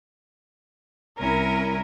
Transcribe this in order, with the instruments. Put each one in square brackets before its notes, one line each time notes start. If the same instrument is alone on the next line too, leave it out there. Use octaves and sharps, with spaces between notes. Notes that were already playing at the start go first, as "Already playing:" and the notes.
[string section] C2 A#4 [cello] C#4 E4